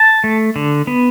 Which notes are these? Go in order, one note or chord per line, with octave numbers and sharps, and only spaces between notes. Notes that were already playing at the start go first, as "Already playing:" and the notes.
Already playing: A5
A3
D3
B3